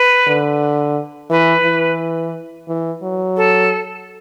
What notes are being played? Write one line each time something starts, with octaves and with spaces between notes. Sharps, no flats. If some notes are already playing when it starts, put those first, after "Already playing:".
Already playing: B4
D3
E3 B4
E3
E3
F#3
A4